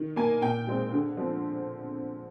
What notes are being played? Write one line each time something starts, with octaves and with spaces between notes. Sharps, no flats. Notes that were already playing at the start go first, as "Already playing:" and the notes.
Already playing: D#3
A#3 G#5
A#2 G5
G#3 C4
D3
F3 C4